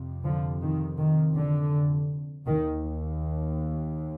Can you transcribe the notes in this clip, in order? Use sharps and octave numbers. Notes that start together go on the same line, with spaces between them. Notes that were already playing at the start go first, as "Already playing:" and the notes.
Already playing: F2 C3
D3 F3
D#3
D#3
D3
D#2 D#3